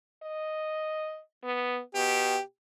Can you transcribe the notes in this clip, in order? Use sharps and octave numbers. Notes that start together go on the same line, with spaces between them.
D#5
B3
B2 G4